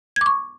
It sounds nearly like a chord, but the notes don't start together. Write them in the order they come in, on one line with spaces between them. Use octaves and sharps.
G#6 D6 C#6